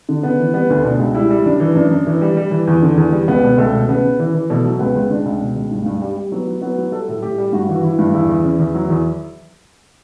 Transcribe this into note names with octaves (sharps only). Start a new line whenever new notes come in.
D3
C#3 B3
E3
G3 B3
D2
B2 D4
C#2
G3 E4
G3
F#2 D4
E3
F#2 D4
F#2
E3
G3
G3
E3
E2
D3
E2
G3
C#2 B3
B2
C#2 A3
B2
C#3 B3
C#3
E3
E3
B2 A3
F#3
C#2 B3
C#2
C#2 D4
C#2
B2
C#2
G2
G2
G3
G3
F#3 B3
F#3
F#3 B3
F#3
G3 A4
A2
A2 G4
G3
G2 F#4
E3
F#4
E3 E4
G2
E2 E4
E2
C#3
E2
F#3
E2